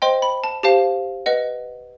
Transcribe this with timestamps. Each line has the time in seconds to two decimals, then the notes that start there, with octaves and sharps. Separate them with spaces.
0.02 C5 D#5 G5 C6
0.22 B5
0.44 A5
0.63 G4 C5 F5 A5
1.26 B4 D#5 F#5